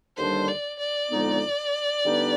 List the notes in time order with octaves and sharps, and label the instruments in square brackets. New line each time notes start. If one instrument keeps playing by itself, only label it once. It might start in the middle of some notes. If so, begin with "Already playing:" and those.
[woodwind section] D#2 D3 G3 D4 [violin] C5
[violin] D5
D5
[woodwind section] F2 D3 G#3 B3 D#4
D3 G3 B3 D#4 B4